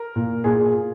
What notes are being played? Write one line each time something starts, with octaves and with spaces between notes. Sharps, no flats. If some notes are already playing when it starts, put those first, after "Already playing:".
Already playing: A#4
A#2
A#2 G#4